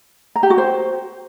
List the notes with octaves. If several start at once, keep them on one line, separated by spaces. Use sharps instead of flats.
A#5
G4
F#4
C5